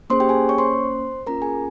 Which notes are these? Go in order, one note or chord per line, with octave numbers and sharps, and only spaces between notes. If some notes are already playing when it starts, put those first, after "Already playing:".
A#3 C#4 G#4 C5 C6
G4 G5
G#4 G#5
C#5 C#6
C5 C6
A#3 C#4 F4 A#4 A#5
G#4 G#5